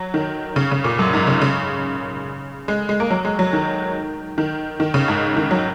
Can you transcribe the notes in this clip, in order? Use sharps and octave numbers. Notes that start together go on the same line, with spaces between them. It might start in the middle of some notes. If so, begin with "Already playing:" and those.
Already playing: F#3
D#3
C#3
C#3
A#2
F#2
G#2
C#3
C#3
G#3
G#3
A#3
F#3
G#3
F#3
D#3
D#3
D#3
C#3
G#2
D#3
F#3